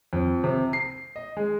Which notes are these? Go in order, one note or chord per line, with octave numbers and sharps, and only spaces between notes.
F2
C3
C7
D#5
G#3